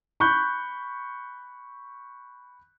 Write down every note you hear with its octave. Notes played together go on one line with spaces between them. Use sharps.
B5 C#6 F#6 G6